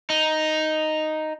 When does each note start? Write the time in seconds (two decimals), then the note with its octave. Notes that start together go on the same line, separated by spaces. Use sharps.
0.10 D#4